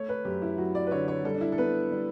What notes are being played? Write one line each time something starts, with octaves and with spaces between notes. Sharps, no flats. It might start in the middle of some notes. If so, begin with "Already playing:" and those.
Already playing: A3 C#5
B4
F#2 G4
E4
F#3 F#4
D5
B4
D3 C#5
C#5
G3 A4
D4
E4
A4
B3 B4
G3